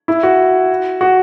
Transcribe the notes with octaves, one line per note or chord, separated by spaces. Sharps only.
E4
F#4
F#4